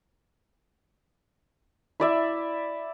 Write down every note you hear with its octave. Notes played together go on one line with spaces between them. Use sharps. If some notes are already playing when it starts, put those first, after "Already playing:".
E4 D5 E5